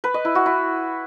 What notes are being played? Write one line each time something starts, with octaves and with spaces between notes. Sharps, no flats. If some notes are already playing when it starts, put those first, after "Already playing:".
B4
D#5
E4
F#4
E4